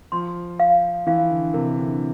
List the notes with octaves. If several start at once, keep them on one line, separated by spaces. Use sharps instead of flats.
F3 C6
F5
E3 F5
D3
C3 A#4
D3